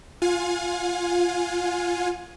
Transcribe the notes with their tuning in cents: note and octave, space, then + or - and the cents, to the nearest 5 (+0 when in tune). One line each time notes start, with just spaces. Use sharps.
F4 +0 F5 +45 G#5 +0